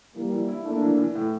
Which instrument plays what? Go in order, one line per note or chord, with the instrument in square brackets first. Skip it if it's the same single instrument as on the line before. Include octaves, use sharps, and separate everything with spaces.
[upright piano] E3 [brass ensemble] G3 A#3
[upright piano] E3
E4
[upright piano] A3 [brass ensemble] A#3 D4
[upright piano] E3
E3
A2